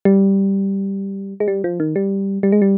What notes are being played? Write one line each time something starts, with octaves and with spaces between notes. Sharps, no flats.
G3
G#3
G3
F3
D#3
G3
G3
G#3
G3